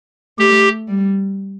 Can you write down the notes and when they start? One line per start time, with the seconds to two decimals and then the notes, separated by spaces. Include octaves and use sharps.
0.38 A3 G4
0.89 G3